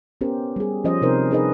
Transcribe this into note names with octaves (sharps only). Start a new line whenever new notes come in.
B3 C#4 G4 A#4 C5
G3 G#4
F3 C#4 C5 D#5
C3 C4 D#4 A#4 C5
D4 D#4 G#4 A#4 B4 D#5